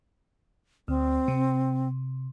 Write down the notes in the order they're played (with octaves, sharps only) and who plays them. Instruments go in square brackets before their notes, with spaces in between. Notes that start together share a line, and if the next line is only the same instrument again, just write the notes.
[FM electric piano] D2 [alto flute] C4
[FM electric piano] C3